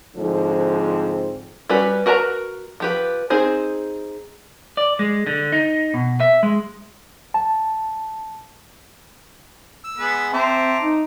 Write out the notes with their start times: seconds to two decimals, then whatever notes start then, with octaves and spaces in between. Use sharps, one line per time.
0.16 G#2 D3 F3 C4
1.69 G3 C#4 F#4 B4
2.06 F#4 A#4 B4 A5 A#5
2.80 F3 G4 B4
3.30 C4 D#4 G#4 C5
4.77 D5
4.99 G#3
5.27 D3
5.52 D#4
5.94 B2
6.20 E5
6.43 G#3
7.34 A5
9.84 E6
9.97 G#3 B3 B4
10.33 C4 C5 E5 A5 A#5 D6
10.81 D#4